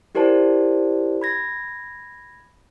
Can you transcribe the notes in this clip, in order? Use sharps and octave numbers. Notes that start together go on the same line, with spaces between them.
E4 G4 A#4 C5 D5 A5
B5 G#6 A#6